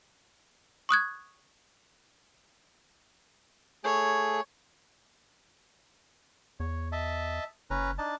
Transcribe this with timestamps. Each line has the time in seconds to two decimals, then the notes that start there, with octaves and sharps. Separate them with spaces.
0.89 C#6 D#6 F#6 G#6
3.84 A3 G#4 C#5
6.60 E2 C#5
6.92 D#5 E5 A5
7.70 F#1 C#4 B4 A#5
7.98 D4 D#4 A5